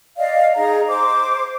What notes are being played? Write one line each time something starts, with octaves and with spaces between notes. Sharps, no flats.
D5 D#5 F5
D#4 G#4 A#5
C5 D6